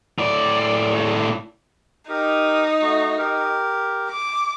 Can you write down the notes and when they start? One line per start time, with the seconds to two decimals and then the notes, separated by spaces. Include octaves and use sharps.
0.19 A2 D5
2.09 D#4 G4 A#4
2.81 A3 F#4
3.18 G4 A#4
4.10 D6